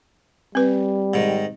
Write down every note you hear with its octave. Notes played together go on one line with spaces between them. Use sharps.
G3 C4 B4
G#2 D#3